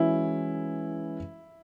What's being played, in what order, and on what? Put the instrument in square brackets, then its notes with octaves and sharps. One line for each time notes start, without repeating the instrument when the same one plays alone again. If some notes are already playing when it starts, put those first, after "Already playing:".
Already playing: [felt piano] E3 G#3 C#4 F#4 B4 [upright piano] E4